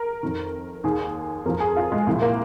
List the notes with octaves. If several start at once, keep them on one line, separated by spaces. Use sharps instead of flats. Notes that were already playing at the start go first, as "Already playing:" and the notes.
Already playing: A#4
F2 D#3
D#2 D#3 G#4
F2 F3 A#4
G#4
F4
G#3
C2 A#2 F3
A#3